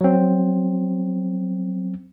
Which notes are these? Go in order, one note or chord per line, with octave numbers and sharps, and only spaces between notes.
F#3 C4